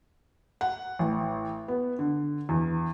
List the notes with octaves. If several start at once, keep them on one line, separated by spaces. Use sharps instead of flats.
F#5
A1
B3
D3
E2